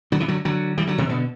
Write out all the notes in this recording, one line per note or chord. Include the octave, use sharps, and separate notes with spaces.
D3 F#3
C3 E3
D3 F#3
D3 F#3
E3 G3
D3 F#3
C3 E3
B2 D3